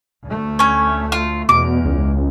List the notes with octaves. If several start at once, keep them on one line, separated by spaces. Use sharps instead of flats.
D2 A3
C#4 C#5
F4
E2 B2 D6
C#2